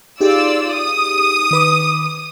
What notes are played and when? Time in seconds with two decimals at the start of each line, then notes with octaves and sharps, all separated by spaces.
0.21 D#4 F4 G4 G#4 D5 E6
0.74 D#6
1.51 D#3 B4 D6